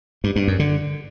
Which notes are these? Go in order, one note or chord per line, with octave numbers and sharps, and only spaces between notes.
G2
G2
F#2
D3